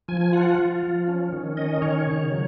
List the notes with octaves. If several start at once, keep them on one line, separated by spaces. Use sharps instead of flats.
F3 G#5
G#5
F4 F#5
F4
F3
C#4
D#3
C#4 D#5
D#3 C#5
C#3
F#3